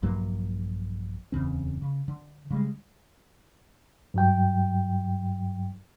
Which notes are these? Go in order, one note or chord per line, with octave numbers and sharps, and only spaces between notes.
A#1 G2 F#3 A#3
D1 E2 C#3 C4
C#3
D3
C#3 G3 G#3
G2 F#3 G5